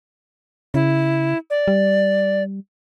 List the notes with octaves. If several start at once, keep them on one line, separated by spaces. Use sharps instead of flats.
C#3 E4
D5
G3